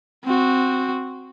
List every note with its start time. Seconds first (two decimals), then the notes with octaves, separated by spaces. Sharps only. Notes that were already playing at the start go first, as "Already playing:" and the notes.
0.25 C4 F#4